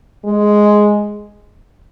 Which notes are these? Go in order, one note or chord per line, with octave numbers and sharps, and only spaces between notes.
G#3